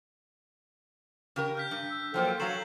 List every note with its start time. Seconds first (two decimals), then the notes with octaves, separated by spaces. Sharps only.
1.36 C#3 G4 A#4
1.55 F6 G6 B6
1.71 G2
1.91 E6
2.14 F3 F#3 A#3 A4 C5 G5
2.40 F#3 A4 F5 A#5 C#6 C7 E7 F#7